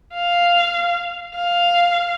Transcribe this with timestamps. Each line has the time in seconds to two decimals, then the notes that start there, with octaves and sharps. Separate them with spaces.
0.14 F5
1.35 F5